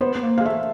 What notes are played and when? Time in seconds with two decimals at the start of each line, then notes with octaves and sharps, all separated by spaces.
0.01 B3 C5
0.16 B3
0.23 A#3
0.38 G#3 F5
0.46 A3 E5